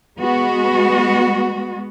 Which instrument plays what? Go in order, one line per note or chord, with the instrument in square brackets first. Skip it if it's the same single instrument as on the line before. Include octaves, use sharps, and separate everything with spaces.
[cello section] G#3 B3 F#4